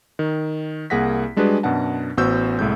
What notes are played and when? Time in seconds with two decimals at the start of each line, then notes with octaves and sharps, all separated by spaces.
0.19 D#3
0.90 C2 A#3 G#4 F#5 A#6 B6
1.37 G3 G#3 D4 F#4 G#4 B4
1.63 F#2 B2 D4 F#5 A5
2.17 A1 B3 F#4 C5 E6 G6
2.59 C2 A2 G#3 G6